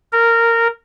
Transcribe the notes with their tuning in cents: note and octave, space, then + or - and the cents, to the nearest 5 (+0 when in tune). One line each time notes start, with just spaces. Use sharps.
A#4 -15